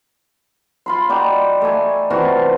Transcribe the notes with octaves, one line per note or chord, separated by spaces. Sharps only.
F4 B5 C6
D#4 F#4 G4 D5
A3 G#5
C3 E3 F4 F#4